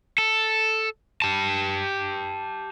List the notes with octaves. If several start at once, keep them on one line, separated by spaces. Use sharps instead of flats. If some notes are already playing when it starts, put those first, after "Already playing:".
A4
G4 A5